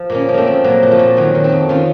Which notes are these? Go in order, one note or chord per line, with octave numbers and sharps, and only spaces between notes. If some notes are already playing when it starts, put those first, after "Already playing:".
Already playing: F3
A#2 A#3 C#4
F3
A3 A#3 C4
F3
A#2 F#3 A#3
A#2
F3 A3
A#2
D#3 F#3
D#3
C4 D#4
F2
D#3 C#4 F4